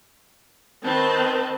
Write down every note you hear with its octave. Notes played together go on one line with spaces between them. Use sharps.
D#3 C4 B4 A5